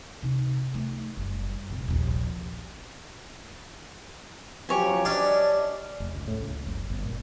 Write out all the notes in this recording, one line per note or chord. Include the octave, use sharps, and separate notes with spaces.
C3 D#4
A3 D#4
F#1 G3
F1 A#2
A#1 D#2
C#3 F3 F#3 G4 C#5 G#5
C#4 D4 D5 D#5
F1
C#2
A2
C#2
F#1
G1
A#2